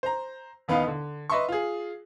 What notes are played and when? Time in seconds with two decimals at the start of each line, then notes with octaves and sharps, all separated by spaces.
0.03 C5 A#5
0.68 A1 D#2 B3 D#4 B4 F5
0.87 D3
1.30 B4 D#5 E5 C6 C#6
1.48 F4 G#4